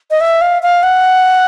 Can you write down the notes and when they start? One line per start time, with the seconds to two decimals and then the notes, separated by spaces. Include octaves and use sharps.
0.11 D#5
0.21 E5
0.41 F5
0.63 F5
0.83 F#5